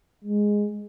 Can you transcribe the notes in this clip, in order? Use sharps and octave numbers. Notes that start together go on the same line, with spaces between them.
G#3